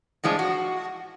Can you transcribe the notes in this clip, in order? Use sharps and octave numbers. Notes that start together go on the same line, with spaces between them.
A2 F3 G#3 D4
F#4